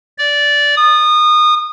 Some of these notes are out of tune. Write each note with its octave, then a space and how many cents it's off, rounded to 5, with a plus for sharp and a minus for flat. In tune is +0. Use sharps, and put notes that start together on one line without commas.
D5 -15
D#6 -25